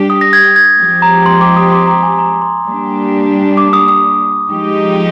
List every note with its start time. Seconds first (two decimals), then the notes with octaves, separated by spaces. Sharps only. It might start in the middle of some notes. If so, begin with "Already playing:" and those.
Already playing: G3 D4 G4
0.10 D#6
0.21 A#6
0.33 G#6
0.56 G#6
0.79 F3 G#3 C4 G4
1.02 A#5
1.26 C6
1.41 D6
1.56 D#6
1.72 C6
1.87 A#5
2.03 G#5
2.19 A#5
2.42 C6
2.65 G3 A#3 D4 G4
3.57 D6
3.73 D#6
3.88 D#6
4.50 F3 G#3 D#4 G4